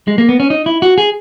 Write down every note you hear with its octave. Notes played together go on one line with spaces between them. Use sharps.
G#3
A#3
B3
C#4
D#4
E4
F#4
G#4